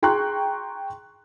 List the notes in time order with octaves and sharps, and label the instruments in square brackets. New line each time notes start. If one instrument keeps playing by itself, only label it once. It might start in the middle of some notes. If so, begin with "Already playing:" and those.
[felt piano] G#4 G5 A#5 C6 C#6 F#6